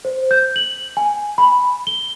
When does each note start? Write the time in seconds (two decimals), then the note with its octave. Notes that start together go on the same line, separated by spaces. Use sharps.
0.05 C5
0.31 G6
0.56 F#7
0.97 G#5
1.38 B5
1.87 G7